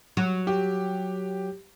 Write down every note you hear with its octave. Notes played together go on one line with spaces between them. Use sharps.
F#3
G4